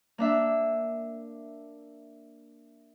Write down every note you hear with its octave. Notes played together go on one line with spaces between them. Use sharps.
A#3 D4 E5